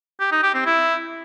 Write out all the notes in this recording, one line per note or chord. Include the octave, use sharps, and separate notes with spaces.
G4
D#4
G4
C4
E4